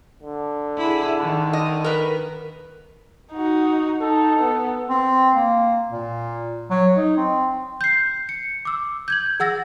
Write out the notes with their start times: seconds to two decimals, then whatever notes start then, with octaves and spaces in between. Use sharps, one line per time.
0.23 D3
0.77 E4 G#4
1.20 D#3
1.53 D#5
1.84 A#4 B4
3.32 D#4 F#4
4.01 D#4 A4
4.39 B3
4.90 C4
5.35 A#3
5.91 A#2
6.70 F#3
6.97 D#4
7.17 C4
7.81 G6 C7
8.29 C#7
8.65 D6 E6
9.08 G6 G#6 F#7
9.40 G#4 F#5 E6 A6 A#6